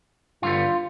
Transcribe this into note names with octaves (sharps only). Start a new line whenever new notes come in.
G2 D3 G3 B3 F4